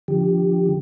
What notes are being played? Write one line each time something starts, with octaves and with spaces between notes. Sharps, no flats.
D3 F3 G4